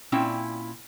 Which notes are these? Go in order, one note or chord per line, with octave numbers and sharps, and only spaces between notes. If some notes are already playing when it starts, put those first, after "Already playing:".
A#2 C4 C#4 E4 G5